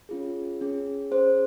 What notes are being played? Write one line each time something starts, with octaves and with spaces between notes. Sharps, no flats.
C#4 F4 G#4
C#4 G#4
C#4 G#4 C5